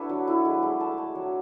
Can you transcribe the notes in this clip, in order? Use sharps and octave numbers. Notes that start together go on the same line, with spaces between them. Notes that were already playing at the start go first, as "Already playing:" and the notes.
Already playing: D4 E4 F#4 A4 B4
F#3
E4
G#3
G#3
A3 A5
A3
F#3